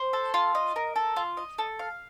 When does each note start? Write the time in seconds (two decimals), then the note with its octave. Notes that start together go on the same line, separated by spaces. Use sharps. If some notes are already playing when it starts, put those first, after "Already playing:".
Already playing: C5
0.13 A4
0.34 F4
0.55 D#5
0.76 A#4
0.96 A4
1.16 F4
1.37 D#5
1.58 A4
1.79 F5